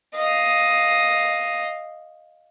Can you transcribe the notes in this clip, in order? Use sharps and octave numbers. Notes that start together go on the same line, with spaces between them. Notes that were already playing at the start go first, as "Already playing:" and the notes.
D#5 F5